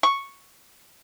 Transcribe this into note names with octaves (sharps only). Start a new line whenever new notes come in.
C#6